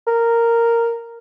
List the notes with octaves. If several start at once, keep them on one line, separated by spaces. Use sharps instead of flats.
A#4